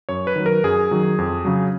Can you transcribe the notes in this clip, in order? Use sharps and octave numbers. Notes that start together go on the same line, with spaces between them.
F#2 C#5
B4
D#3 F#3
A#4
F#2 G#4
D#3 F#3
F2
C#3 F#3